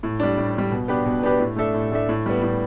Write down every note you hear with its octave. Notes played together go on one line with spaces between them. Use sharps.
A2
G3 D4
A2
G3 D4
B2
B3 D4 G4 B4
B2
B3 D4 G4 B4
A2
A3 D4 A4 E5
A2
A3 D4 A4 E5
A2
G3 B3
A2